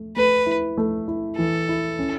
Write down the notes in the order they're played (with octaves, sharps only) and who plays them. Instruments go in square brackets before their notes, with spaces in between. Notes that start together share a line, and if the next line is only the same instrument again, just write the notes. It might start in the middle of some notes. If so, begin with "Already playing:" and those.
Already playing: [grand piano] A3
[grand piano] A3 [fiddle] B4
[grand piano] E4
A3
E4
[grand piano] E3 [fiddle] A4
[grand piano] E4
C#4